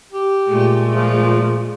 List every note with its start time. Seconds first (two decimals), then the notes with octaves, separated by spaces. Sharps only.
0.12 G4
0.47 A#2 G#3 A3
0.95 F3